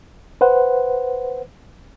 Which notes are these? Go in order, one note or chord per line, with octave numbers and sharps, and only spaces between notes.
B4 C5 F#5